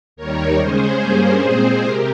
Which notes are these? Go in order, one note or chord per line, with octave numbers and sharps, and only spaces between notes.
D#2 D#3 G3 A#4 C#5
C#3 G#3 C#4 G#4 C5
G2 G3 A#3 C#4
A#2 G#3 C4
C3 G4 A#4